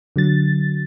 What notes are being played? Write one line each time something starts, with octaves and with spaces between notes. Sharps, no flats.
D3 F#3 A6